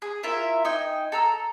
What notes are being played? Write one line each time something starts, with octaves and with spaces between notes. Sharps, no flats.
G#4
E4 F4 A#4 E5
D#4 G5 G#5
A4 A#5 E6